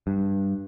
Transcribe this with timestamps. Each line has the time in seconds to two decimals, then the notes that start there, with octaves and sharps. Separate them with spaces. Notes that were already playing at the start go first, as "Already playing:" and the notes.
0.07 G2